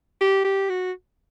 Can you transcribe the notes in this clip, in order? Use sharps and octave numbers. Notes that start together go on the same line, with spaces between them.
G4
G4
F#4